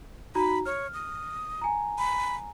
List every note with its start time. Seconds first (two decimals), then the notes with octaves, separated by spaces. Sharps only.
0.35 D#4 F#4 A#5 B5
0.66 C#5 F6
0.94 D#6
1.61 G#5 A#5
1.98 B5